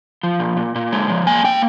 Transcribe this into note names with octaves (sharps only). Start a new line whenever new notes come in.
F3
A#2
A#2
A#2
G#3
F3
A#3 G#5
A#3 G5